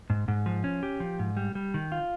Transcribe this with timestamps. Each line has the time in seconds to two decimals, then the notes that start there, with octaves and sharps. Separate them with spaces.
0.10 G#2
0.28 G#2
0.46 F3
0.64 C#4
0.83 G4
1.00 F3
1.19 G#2
1.37 G3
1.55 G3
1.74 D#3
1.92 F4